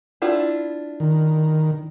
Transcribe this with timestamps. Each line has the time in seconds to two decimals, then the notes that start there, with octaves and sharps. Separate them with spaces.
0.22 D4 E4 F4
1.00 D#3